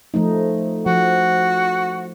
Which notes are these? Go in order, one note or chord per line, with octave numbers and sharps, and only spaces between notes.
F3 A3 D#4
F3 F#4